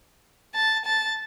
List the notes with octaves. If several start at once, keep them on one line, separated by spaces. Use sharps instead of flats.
A5
A5